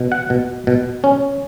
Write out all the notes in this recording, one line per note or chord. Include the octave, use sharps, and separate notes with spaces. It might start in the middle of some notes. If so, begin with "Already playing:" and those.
Already playing: B2
F#5
B2
B2
C#4